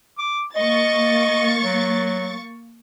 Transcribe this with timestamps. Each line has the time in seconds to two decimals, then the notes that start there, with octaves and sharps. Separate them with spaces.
0.18 D6
0.56 A#3 D#5 C#6 A6
1.63 F#3